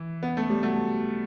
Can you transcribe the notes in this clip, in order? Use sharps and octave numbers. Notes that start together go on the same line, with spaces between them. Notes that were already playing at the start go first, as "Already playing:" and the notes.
Already playing: E3
B3
A3
G3
F#3 A3